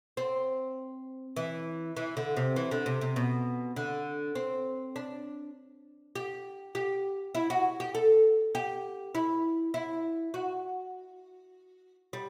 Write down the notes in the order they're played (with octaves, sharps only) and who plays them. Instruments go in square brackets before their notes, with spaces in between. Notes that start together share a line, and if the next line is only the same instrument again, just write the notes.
[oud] C4
E3
E3
D3
C3
E3
D3
C3
C3
B2
D3
C4
D4
G4
G4
E4
F#4
G4
A4
G4
E4
E4
F#4
G3